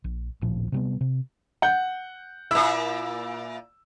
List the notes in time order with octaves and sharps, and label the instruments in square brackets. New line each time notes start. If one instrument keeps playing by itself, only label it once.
[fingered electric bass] A#1
D1 A1 A#2 F3
C3 G3 B3
C3
[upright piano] F#5 G6
[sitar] A#2 E4 [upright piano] E6